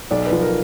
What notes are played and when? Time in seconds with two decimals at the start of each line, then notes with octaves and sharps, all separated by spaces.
0.11 B1 D5
0.26 B4
0.32 F3
0.42 A#4